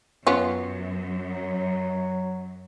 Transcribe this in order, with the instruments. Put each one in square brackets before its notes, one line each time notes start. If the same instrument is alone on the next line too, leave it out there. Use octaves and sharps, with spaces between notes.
[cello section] F#2 [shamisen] B3 C#4 F4
[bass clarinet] F#3